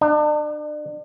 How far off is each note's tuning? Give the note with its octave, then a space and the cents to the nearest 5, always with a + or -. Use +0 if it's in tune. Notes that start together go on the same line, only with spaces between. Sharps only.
D4 +35